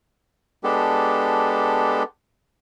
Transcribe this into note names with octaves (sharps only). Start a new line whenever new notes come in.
G#3 B3 D4 G4 A4